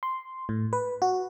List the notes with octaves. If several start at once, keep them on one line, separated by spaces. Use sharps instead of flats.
C6
A2
B4
F#4